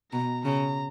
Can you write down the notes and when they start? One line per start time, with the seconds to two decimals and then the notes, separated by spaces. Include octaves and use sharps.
0.12 B2 A#5
0.45 C#3 A#5